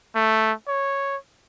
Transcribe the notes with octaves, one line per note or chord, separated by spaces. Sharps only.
A3
C#5